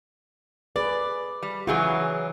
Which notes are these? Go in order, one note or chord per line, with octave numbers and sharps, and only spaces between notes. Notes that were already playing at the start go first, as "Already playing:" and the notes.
G#4 B4 D5
G3
C#3 E3 F#3 F#4 G#4